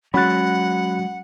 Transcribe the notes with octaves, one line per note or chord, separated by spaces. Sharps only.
F#3 G#3 C#4 F#4 F#5 B5 F#6 A6